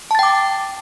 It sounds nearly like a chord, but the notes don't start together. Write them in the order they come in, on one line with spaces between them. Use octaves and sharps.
A5 A6 G5 D6